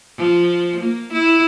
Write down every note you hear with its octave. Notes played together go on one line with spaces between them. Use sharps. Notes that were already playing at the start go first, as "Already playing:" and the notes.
F3
A#3
E4